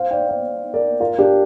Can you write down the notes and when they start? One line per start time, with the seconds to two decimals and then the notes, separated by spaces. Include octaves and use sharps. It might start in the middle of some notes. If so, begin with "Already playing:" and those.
Already playing: C5 F5
0.11 D5 G5
0.29 C5 F5
0.74 A#4 D5
1.00 F4 A#4
1.18 D4 G4